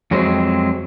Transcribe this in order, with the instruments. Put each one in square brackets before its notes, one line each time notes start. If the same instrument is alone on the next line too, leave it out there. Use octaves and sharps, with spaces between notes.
[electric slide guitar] F2 F#3 G#3 C4